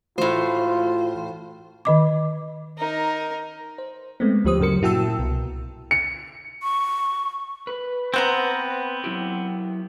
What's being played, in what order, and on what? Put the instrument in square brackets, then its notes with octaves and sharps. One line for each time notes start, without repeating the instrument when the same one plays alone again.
[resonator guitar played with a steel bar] A2 C5 [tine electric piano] E3 A3 F#4 [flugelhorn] F4
[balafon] D#3 D#5 D6
[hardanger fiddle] D#4 A#4
[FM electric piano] C5
G#3 A3 B3 C4
D2 F3 G4 C5 D#6
G2 C#3 F#3 A#4 C#7
A#2 E4 F#4 G5 A5 E6
C2 B2
[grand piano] C#7
[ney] C#6
[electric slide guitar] B4
[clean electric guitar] B3 C4 [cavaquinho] C5 F#5 A#5
[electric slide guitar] F#3 E4 G4